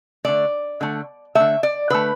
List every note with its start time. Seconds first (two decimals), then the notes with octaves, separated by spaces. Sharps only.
0.25 D3 A3 D5
0.81 D3 A3
1.35 D3 A3 E5
1.63 D5
1.90 D3 A3 B4